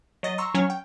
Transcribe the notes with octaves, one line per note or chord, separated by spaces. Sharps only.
F#3 D#5 A6
A#5 C6 C#6 E6
F#3 C#4 C#5 F6
G5